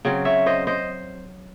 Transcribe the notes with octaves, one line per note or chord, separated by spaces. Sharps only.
C#3 F#3 C4
C#5 E5
C5 D#5
C5 D#5